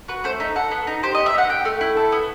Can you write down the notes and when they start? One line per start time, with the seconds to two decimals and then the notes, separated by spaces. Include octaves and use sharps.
0.08 F#4 B4
0.24 A3 C5
0.40 D#4 E5
0.56 A4 F#5
0.71 B3
0.87 D#4
1.03 G4 C5
1.14 B3 D#5
1.26 E5
1.34 D#4 F#5
1.49 G4 G5
1.65 A3
1.81 E4
1.97 A4
2.12 B3